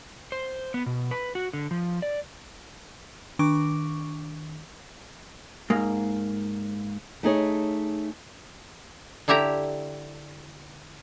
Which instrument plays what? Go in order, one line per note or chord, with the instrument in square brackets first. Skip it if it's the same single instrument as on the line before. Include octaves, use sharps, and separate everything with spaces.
[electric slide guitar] C5
B3
B2
B4
F#4
D3
F3
D5
[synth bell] D#3 D4 C#6 D6 D7
[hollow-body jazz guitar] G#2 A#3
[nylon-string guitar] A3 D#4 G#4 C#5
[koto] D3 E4 G4 E5 A#5